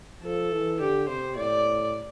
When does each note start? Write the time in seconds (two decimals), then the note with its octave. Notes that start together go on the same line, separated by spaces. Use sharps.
0.23 F3 A4
0.52 E3
0.80 D3 G4
1.08 C3 C5
1.36 A2 D5